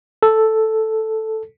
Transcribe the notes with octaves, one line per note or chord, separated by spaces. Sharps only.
A4